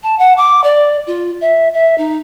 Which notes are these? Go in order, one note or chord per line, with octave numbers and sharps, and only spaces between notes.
A5
F#5
D6
D5
F4
E5
E5
D#4